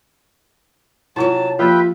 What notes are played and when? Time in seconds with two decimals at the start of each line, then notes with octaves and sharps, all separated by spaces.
1.16 C3 F#3 C#4 E4 F4 A5
1.59 F3 A#3 F4 G4 B4 E5 G5